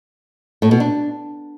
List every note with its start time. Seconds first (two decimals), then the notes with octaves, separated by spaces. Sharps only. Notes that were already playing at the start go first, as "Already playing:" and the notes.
0.62 A2
0.71 B2
0.80 D4